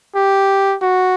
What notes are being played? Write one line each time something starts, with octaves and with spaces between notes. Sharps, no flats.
G4
F#4